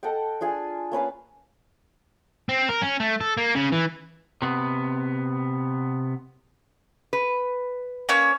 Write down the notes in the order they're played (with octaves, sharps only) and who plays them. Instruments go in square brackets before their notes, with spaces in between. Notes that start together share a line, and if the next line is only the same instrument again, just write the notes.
[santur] A4 D#5 F#5 G5
D4 F4 G#4 G#5
A#3 C#4 B4 F5
[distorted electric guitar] C4
A#4
C#4
A3
A4
A#3
C#3
E3
[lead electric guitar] C3 B3
[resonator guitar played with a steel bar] B4
[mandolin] A#3 C#4 C#5